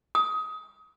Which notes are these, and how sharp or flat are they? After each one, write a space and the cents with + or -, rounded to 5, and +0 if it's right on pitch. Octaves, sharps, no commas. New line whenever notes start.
D#6 +20